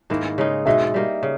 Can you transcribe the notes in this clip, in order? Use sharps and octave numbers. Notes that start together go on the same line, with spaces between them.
G#2 D#3 A#3 E4
C#3 G#3 D#4
B2 G#3 D#4 E5
G3 A#3 D#4 A#4
C#3